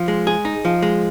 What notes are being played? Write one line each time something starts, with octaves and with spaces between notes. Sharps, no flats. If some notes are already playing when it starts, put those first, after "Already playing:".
Already playing: F3
G#3
G#4
D#4
F3
G#3